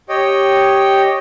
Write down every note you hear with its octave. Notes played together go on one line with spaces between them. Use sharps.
G4 C#5 D#5 G5